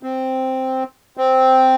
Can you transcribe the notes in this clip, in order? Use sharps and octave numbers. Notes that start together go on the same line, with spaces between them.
C4
C4